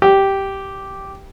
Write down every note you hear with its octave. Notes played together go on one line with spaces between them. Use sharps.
G4